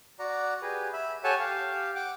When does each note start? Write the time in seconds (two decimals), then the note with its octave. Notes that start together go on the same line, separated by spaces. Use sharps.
0.19 F#4 D5 F#5 A#5
0.62 G4 G#4 B4
0.93 E5 B5
1.24 G4 A4 C#5 F#5 G#5 A5
1.39 G4 F5
1.95 F#5 G5 D6